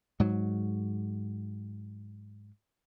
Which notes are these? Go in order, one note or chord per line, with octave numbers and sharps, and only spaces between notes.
G#2 F#3